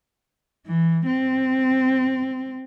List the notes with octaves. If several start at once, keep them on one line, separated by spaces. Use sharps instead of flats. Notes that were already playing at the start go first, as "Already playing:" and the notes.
E3
C4